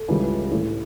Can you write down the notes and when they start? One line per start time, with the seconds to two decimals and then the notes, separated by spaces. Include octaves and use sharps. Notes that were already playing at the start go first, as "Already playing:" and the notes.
Already playing: A4
0.08 C#2 C#3 E3 G3
0.51 A2 E3 A3